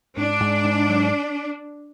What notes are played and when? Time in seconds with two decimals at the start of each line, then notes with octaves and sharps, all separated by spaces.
0.17 G#2 D4
0.40 G#2
0.64 G#2
0.88 F#3